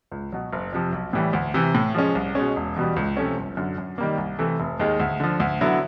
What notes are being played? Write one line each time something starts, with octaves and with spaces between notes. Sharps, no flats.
C#2
B2 F#3
F#1
F2 C3 F3
B1
A2 E3 G3
D2
C3 E3
A2
F3 G#3 C#4
C2
B2 G#3 C#4
E1
E2 B2 G3
C#2
C3 F3 A3 C#4
G1
F#2 D3
F#2
D#3 G3 A#3
C2
C3 E3 A3
F1
D#2 D#3 G#3
D2
D3 F3
D2
D3 F#3 B3 E4